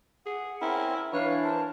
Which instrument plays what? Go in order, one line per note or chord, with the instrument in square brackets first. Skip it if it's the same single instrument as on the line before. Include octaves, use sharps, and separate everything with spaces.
[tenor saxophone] G#4 [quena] F#5
[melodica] C4 C#4 A#4 [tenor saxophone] E4
[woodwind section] E3 D4 [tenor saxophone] C#5 [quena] F5 [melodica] G#5
[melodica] A#4 C5 [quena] A5